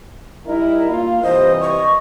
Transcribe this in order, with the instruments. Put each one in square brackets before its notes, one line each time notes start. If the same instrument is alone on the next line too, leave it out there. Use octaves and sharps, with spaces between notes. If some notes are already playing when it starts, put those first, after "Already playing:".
[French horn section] G3 D#4 E4 [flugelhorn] A#4
[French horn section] A#3 F4 [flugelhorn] F5
[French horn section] G2 C3 E3 [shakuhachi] C5 [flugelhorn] D#5
[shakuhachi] C#6